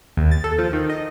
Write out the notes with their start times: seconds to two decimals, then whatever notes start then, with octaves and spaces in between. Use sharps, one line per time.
0.17 D#2
0.31 A6
0.44 A4
0.59 F3
0.73 D#3
0.89 D#5